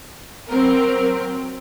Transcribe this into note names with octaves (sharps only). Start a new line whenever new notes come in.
F#3 C4 A#4